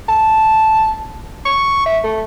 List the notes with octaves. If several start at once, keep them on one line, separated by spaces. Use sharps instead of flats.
A5
C#6
E5
A3